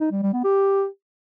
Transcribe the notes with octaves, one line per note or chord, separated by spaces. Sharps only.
D#4
G3
G3
B3
G4